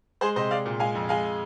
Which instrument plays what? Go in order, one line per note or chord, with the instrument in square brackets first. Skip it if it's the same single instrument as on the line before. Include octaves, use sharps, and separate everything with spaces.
[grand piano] G#3 G#4 C5
C3 C5 D#5
G#3 D5 F5
A#2
G#3 F5 G#5
F2
G#3 F5 G#5